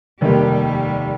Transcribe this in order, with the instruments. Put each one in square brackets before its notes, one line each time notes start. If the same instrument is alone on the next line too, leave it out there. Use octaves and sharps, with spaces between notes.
[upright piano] F1 D#2 D#3 A#3 G4 [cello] G3